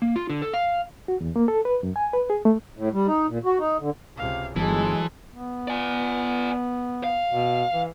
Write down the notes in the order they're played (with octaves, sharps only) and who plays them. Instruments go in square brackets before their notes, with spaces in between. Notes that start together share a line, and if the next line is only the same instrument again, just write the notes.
[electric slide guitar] A#3
F4
D3
A4
F5
[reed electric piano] F#4
E2
A#3
A4
B4
F#2
G#5
B4
G#4
A3
[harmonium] A2
G3
D#4
A#2
F#4
D#4
D3
[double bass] C#2 C3 [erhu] F5
[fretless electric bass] G1 [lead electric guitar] E3 [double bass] F#3 G#3 [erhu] A4
[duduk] B3
[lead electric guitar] D5 G#5
F5
[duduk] B2
E3